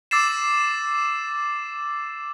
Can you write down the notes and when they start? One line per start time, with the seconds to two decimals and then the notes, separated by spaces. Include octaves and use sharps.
0.11 D6 E6 A6 C7 E7